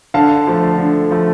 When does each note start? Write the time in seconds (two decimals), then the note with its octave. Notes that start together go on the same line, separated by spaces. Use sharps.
0.14 D3 F5 A5
0.47 F3 A3
0.78 D3
1.11 F3 A3